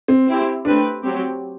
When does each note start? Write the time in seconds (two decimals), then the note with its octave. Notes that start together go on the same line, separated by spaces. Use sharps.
0.08 C4
0.27 C4 E4 G4
0.65 A3 C4 D4 G4 B4
1.04 F#3 C4 G4